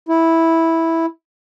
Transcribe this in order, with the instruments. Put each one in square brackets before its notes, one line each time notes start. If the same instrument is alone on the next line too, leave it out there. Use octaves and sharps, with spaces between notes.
[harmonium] E4